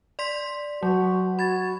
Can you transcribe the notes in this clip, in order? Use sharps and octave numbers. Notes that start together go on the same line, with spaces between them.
D5 C6 B6
F#3 F#4
F#4 B5 G#6 A6